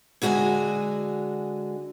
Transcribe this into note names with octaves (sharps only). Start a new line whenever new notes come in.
D3 G#3 F#4 C#5 D#5 G#5